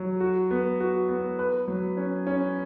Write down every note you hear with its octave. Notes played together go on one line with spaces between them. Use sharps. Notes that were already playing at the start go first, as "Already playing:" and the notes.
Already playing: F#3
F#4
B3
F#4
B3
B4
F#3
C#4
C#4